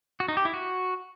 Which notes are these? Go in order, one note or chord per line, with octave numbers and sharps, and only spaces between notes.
F#4
D#4
G4
E4
F#4